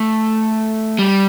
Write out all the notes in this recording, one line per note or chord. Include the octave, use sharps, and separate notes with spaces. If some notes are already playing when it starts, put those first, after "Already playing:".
Already playing: A3
G3